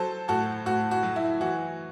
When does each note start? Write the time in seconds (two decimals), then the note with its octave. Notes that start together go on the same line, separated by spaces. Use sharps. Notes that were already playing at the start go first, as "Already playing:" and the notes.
Already playing: F#3 A4 C5
0.28 A2 F#4 A4
0.66 A2 F#4
0.91 F#4
1.03 F#3
1.16 E4
1.41 E3 F#4